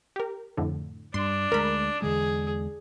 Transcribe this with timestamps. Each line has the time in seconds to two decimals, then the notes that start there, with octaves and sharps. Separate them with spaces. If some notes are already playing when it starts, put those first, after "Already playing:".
0.16 G4 A#4
0.57 F2 A2 D3
1.14 G2 D4 C6
1.52 D2 G#3 A#4 B5
2.02 E2 D3 G#3 G#4